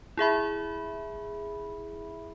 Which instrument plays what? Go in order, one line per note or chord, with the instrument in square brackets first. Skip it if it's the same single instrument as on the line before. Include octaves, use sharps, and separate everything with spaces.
[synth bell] E4 G#4 E5 B5